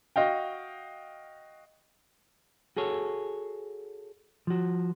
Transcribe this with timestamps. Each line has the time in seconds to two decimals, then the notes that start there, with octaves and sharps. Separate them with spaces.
0.16 F#4 D#5 F5 G5
2.77 F#4 G#4 A4 C#5
4.47 F3 F#4